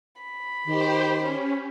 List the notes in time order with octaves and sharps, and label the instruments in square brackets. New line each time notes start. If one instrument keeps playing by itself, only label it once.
[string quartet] B5
[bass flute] D#3 [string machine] G4 C5
[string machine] C#4